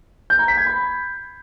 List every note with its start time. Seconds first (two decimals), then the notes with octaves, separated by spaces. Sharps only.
0.30 G6
0.39 A#5
0.48 B6
0.57 G#6
0.66 B5